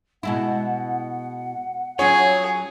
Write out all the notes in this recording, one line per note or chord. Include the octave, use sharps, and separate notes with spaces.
B2 G#3 E4 F#5
F#3 C#4 F4 G#4 C#5